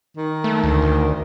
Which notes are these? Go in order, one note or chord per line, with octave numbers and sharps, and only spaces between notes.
D#3
A3
D2
D2